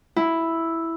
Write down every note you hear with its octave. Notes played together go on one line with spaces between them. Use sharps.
E4